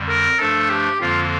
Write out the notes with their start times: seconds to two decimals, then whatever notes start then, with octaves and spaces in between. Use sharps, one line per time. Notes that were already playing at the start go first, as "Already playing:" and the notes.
Already playing: F2 D3 G3
0.09 A#4
0.39 G2 F3 A3 D4 A4
0.70 G4
1.00 F2 D3 F3 A#3 F4